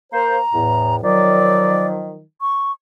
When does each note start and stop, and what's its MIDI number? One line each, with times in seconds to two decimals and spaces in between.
0.13 0.38 58
0.13 0.38 70
0.13 0.38 72
0.13 0.96 82
0.53 0.97 40
0.53 0.97 45
1.03 2.20 51
1.03 2.20 53
1.03 2.20 54
1.03 1.87 74
2.41 2.72 85